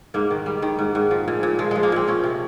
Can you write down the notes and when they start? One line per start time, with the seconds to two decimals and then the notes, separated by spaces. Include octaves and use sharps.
0.14 G#2 A#3
0.30 D#3
0.46 G3
0.62 D#3
0.79 G#2
0.95 G#2
1.11 F3
1.28 A#2
1.43 A#2
1.59 F3 G#3
1.71 F3 G#3
1.83 A#3
1.92 A#2 C4
2.07 F3 C#4
2.24 C3